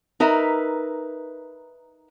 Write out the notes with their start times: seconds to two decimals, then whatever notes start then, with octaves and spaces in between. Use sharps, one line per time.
0.20 D#4 A#4 B4 E5